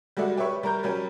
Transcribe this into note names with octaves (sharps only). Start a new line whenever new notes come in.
G3 G#3 F#4 A4 D5 E5
G4 B4 C#5 E5 C#6
G3 A#4 A#5 G6
F#3 G3 C#4 A#4